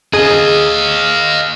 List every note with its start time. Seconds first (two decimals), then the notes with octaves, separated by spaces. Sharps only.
0.13 G#4 D#5 F5